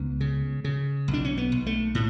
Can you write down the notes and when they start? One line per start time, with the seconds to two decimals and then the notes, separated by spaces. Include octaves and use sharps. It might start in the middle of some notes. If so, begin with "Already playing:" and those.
Already playing: C#2 B3
0.21 C#3
0.64 C#3
1.08 B1
1.13 D4
1.25 C#4
1.37 B3
1.52 B1
1.66 A3
1.95 A2